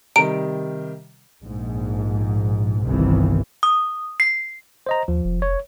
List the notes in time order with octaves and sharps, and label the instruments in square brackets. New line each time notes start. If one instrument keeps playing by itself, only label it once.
[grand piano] C3 D#3 G3 [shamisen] A#5 [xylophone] D7
[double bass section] A#1 G#2
G1 C2 C3 D#3 E3
[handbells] D#6
C7
[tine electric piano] C5 D#5 A#5
[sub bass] D#2 [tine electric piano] F3
[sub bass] F1
[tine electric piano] C#5